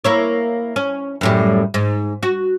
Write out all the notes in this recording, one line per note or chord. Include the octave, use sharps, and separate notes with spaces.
A#3 E4 C#5
C#4
F#2 A2 G3
G#2
F#4